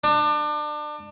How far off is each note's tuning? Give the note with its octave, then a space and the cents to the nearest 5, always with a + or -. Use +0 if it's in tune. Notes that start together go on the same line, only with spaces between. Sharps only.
D4 +30